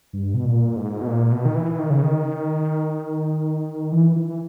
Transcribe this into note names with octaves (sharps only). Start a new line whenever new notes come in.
G2
B2
A#2
G#2
B2
A#2
B2
D#3
E3
D#3
C#3
D#3
E3
E3